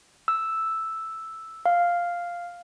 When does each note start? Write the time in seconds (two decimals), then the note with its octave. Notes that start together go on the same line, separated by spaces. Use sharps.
0.28 E6
1.66 F5